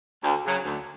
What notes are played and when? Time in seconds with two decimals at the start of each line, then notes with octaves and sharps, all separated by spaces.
0.23 D2
0.44 C#3 F#3
0.64 D2